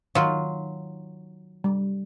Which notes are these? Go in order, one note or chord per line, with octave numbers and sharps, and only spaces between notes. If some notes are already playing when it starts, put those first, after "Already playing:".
D#3 F#3 F4
G3